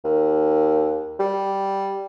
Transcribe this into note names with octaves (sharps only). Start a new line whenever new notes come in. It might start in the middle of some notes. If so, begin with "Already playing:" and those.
D#2
G3